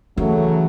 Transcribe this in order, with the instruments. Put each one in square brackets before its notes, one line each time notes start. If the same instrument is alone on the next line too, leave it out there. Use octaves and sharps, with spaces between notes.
[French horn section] C#3 F#3 A3 [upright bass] E3